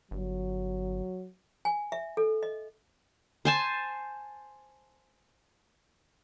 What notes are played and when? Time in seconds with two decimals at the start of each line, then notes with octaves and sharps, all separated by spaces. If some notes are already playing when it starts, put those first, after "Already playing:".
0.11 G1 F#3
1.65 G#5
1.92 E5
2.17 A4
2.43 D#5
3.45 C5 G#5 A5